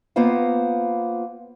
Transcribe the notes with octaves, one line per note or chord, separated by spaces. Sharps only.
A#3 B3 F4 C5 F5